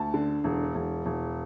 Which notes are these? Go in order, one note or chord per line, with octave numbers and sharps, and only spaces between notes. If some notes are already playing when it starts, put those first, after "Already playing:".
Already playing: D2 A5
D3
E1
E1
E1